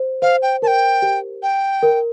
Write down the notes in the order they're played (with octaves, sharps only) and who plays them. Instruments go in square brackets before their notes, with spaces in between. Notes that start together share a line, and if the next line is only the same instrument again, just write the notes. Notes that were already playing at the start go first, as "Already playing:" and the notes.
Already playing: [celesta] C5
[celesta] C5 [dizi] F5
[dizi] G5
[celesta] A#4 [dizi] A5
[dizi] G5
[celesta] G4
[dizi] G5
[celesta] A#4